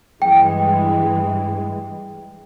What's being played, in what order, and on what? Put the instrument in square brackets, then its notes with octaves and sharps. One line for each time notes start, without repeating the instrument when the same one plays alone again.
[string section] G2 E3 G#3 [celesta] G5